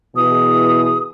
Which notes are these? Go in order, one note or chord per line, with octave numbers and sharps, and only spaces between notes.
B2 E3 G#4 D#6